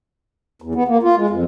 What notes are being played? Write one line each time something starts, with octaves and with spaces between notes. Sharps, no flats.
E2
B3
A#3
F4
G#3
F2